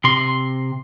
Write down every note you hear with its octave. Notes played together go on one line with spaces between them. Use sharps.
C3 C6